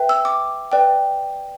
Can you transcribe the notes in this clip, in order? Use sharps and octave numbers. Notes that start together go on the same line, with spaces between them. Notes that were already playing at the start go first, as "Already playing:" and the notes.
Already playing: B4 E5 G5
E6
D6
B4 D5 G5